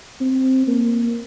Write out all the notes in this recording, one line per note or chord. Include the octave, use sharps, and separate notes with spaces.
C4
A#3